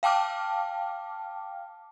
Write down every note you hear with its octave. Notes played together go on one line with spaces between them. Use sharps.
F5 G5 A5 D6 F6